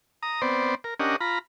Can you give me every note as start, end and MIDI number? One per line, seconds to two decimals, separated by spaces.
0.23 0.41 82
0.23 0.41 87
0.42 0.75 59
0.42 0.75 60
0.42 0.75 72
0.42 0.75 74
0.84 0.94 70
1.00 1.16 61
1.00 1.16 62
1.00 1.16 67
1.00 1.16 70
1.00 1.16 75
1.00 1.16 78
1.20 1.39 65
1.20 1.39 82
1.20 1.39 83